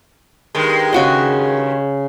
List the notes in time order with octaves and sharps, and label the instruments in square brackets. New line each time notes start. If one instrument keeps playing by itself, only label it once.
[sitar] G2 D#3 G#3
[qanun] C#3 F#4 D#5